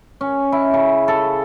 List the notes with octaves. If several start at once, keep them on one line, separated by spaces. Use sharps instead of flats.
C#4
E4
C#3
A4